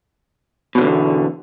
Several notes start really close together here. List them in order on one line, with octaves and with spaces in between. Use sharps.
B2 F#3 D3 G2 E2